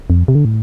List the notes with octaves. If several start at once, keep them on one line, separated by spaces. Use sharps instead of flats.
F2
C3
D3
A2